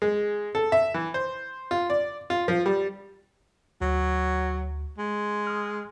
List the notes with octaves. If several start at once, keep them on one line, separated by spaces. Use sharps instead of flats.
G#3
A4
E5
E3
C5
F4
D5
F4
F3
G3
D2 F#3
G#3
D#6 F6